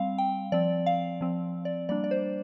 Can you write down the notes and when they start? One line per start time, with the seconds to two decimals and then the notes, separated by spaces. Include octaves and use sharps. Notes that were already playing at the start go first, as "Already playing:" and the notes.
Already playing: G3 C4 F5
0.18 G5
0.52 F3 C4 D5
0.86 F5
1.21 F3 C4
1.65 D5
1.89 G3 A#3 D4 D5
2.04 D5
2.11 C5